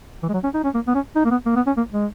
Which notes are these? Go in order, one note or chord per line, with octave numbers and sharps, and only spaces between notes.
E3
G#3
F#3
C#4
D#4
C#4
A#3
B3
C#4
D#4
A#3
B3
A#3
B3
C#4
A#3
G#3